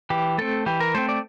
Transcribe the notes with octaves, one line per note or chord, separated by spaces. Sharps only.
E3 G4
A3 C4 A4
E3 G4
A#4
A3 C4 C5
D5